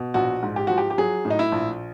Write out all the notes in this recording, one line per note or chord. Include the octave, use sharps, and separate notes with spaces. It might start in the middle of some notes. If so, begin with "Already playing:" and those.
Already playing: B2
A#1 F#4
G#2
G4
F3 F#4
G4
G4
F#3 G#4
A2
D#4
E4
A#1